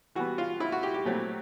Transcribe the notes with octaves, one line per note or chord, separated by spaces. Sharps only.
E3 G3 B3 F#4
F4
E4
F#4
G4
G4
A#2 F#3 A3 C4